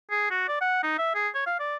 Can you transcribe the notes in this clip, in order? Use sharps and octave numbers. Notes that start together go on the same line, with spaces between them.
G#4
F#4
D5
F#5
D#4
E5
G#4
C#5
F5
D5